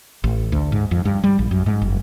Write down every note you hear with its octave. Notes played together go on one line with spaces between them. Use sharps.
A1
D2
G#2
F2
G2
G3
A#1
F#2
G#2
F#1